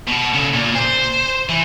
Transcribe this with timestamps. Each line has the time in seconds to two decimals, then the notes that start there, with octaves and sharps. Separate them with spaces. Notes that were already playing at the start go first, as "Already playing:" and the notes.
0.08 B2 F#4
0.34 C#3 A4
0.54 A#2
0.76 C5
1.49 E3